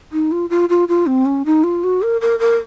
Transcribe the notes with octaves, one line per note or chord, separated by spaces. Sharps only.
D#4
F4
F4
F4
F4
C4
C#4
D#4
F4
F#4
A#4
A#4
A#4